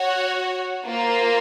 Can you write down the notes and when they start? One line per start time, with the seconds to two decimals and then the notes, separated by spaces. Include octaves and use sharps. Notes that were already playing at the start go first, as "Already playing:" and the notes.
Already playing: F#4 C#5 F#5
0.86 A#3 F4 C5